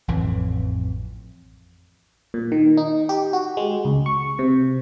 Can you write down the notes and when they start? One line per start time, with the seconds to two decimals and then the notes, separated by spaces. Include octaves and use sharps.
0.08 A1 F2 E3
2.34 A#2
2.52 D#3
2.77 D#4
3.09 G4
3.33 F#4
3.57 G#3
3.85 C#2
4.06 C#6
4.39 C3